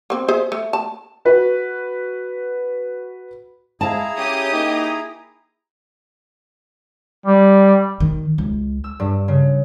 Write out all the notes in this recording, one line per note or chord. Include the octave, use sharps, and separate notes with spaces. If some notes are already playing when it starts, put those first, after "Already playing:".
A#3 C4
G#4 C5 E5
A3
A5
F#4 B4
G#3 E4 G#4 F5 A5 A#5
C#4 G4 D#6
A#3 D#4
G3
D#3
C#2
E6
G2
C#3